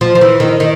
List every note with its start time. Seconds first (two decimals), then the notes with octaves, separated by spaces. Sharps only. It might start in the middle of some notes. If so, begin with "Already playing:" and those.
0.01 F3
0.15 F3
0.21 E3
0.40 D#3
0.60 D#3